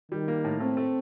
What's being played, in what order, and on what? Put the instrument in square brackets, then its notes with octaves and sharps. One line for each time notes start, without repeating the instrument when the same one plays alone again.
[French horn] D#3 [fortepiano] G3
[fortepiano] A#3
A2
[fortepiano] A3 [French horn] C4
[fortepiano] A3